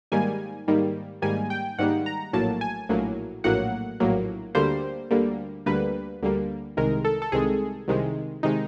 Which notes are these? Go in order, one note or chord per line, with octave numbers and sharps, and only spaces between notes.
G#2 D#3 G3 A#3 G#5
G#2 D#3 G3 A#3
G#2 D#3 G3 A#3 G#5
G5
G#2 D#3 G3 A#3 F#5
A#5
A#1 A2 F#3 A#3 A5
G#5
A#1 A2 F#3 A#3
A#1 A2 F#3 A#3 F#5
A#1 A2 F#3 A#3
D2 D3 G3 A#3 C5
D2 D3 G3 A#3
D2 D3 G3 A#3 B4
D2 D3 G3 A#3
C2 C3 D#3 G#3 A#4
A4
A4
C2 C3 D#3 G#3 G#4
C2 C3 D#3 G#3
C3 D#3 G#3 D#4